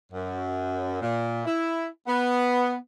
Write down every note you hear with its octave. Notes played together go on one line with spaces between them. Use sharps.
F#2
A#2
E4
B3